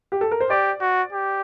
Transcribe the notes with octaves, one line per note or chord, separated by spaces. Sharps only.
G4
A4
A#4
C5
G4 D5
F#4
G4